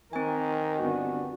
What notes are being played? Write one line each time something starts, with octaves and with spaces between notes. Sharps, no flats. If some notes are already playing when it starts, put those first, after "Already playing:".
D#3 C4 A#4 G#5
G1 B3 D4 F#4